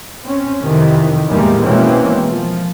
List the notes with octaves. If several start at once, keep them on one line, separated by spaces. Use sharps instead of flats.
C4 C#4
F2 C3 D#3 E3
E2 A2 D#3 G3 G#3 A#3
B2 E3 G#3 A#3 C4 C#4
F3